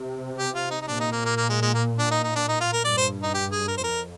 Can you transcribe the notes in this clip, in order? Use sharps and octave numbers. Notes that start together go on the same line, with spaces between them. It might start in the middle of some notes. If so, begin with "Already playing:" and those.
Already playing: C3
G4
F4
D#4
D#4
A#2 D4
D#4
A#3
A#3
A#3
G#3
G#3
A#3
D4
D#4
D#4
D4
D#4
F4
A#4
G2 D5
C5
D#4
G4
G#4
A#4
C5
F2 A#4